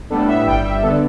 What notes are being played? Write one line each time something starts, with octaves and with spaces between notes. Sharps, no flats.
A2 G3 B3 D4 A4
E5
G1 G2 G3 G5
E5
D3 B3 D4 A4